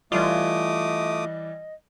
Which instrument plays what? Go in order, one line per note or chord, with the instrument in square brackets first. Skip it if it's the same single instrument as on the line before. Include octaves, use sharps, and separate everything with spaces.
[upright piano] E3 G3 D5 [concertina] A3 D6 D#6 [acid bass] F4 [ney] D#5